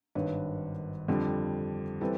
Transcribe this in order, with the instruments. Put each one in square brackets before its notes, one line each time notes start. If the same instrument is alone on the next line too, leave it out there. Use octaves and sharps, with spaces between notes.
[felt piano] G#1 G2 D#3 B4 C#5
F2 D3 G3
E3 G3 C4 A4 B4